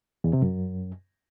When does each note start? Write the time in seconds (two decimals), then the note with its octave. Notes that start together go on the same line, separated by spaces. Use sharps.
0.24 E2
0.33 C3
0.42 F#2